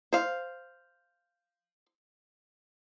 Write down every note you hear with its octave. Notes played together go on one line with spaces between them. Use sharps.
C5 F5